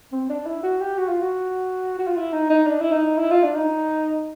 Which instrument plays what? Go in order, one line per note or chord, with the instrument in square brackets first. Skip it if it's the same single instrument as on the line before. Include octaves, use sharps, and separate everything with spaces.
[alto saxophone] C4
D4
E4
F#4
G4
F#4
F4
F#4
F#4
F4
E4
D#4
D#4
D4
E4
D#4
E4
F4
D4
D#4